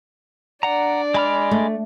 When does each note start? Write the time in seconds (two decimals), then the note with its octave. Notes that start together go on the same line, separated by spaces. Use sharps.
0.63 D4 D5 F#5 A#5
1.14 G#3 B5 F6
1.51 A3